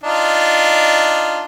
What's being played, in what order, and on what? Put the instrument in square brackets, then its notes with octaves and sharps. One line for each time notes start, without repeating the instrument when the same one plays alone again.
[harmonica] D4 D#4 F4